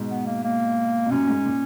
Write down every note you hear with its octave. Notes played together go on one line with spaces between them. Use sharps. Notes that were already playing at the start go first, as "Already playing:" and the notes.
Already playing: G#2 B2
B3
A#3
A#3
B2
F#2 A#2 C#4
G#2
A#2